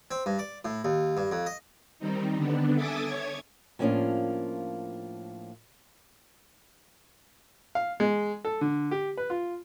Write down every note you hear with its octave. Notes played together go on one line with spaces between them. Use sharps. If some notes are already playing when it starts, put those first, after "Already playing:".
C4
G2
D5
A2
D#2
G2
F2
D#5
D#3 G3 C4 D#4
D3 B3 D4
A4 E5 G#5 D6 D#6 A6
C#5 G#6
A2 F3 A#3 C#4 D4 F4
F5
G#3
A4
D3
G4
B4
F4